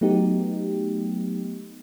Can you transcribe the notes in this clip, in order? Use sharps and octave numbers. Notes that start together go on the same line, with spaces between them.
F#3 A3 B3 D#4 G4